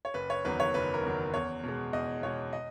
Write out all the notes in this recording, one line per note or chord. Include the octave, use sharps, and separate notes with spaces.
C#5
F#1 B4
C#5
E2 D#3 F#3 B4
C#5
F#1 B4
A#4
E2 D#3 F#3
E2 C#5
B2 G#3
E2 D#5
B2 G#3 C#5
D#5